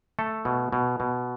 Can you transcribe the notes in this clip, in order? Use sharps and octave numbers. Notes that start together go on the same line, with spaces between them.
A3 A4
B2
B2
B2